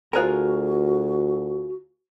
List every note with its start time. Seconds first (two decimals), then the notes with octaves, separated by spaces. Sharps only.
0.13 D2 F4 F#4 G#4 A#4 C5 G#5